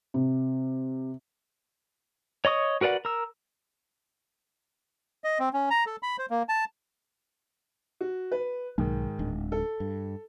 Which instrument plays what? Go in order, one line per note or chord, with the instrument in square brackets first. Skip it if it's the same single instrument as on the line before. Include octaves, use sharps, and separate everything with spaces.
[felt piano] C3
[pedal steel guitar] C#5 D#5 C#6 D#6
F#4 A#4 B4 D5 F#5
A#4 E6
[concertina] D#5
C4
C#4
A#5
A4
B5
C5
A#3
A5
[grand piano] F#4
B4
[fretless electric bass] B1 [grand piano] G#2 D#3
[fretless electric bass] D1 G#3 D4
[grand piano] A4
[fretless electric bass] G2